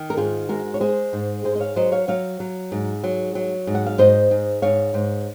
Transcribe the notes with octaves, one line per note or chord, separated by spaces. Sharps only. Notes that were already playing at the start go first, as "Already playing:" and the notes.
Already playing: D#3
A#4
G#2 F4 G#4
G#3 F#4 A#4
C#5
G#3 G#4 C5
G#2
G#2 G#4 C5
D#5
C#5 F5
F#3 C5 D#5
C#5 F5
F#3 C#5 F5
F#3
G#2
F#3
F#3
G#2
F#5
F5
G#2 C5 D#5
G#2
G#2 C#5 F5
G#2